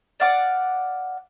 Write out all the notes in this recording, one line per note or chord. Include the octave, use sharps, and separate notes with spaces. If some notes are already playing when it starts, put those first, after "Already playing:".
D5 F5 F#5 D6